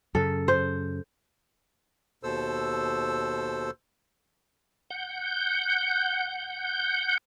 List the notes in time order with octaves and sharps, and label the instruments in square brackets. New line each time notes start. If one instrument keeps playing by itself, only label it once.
[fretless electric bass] F#2 C#3 [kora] A4
[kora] C5
[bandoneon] D#2 B2 A4 C5 E6
[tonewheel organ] F#5 G6